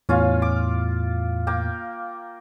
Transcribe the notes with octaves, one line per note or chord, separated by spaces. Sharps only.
E2 A2 C#4 F4 F5
D6
A#3 G5